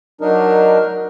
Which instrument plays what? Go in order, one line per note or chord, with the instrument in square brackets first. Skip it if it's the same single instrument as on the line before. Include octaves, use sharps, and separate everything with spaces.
[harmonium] F#3 D4 D#4 A#4